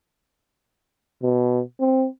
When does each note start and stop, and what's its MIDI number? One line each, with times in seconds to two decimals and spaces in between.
1.23 1.61 47
1.80 2.07 60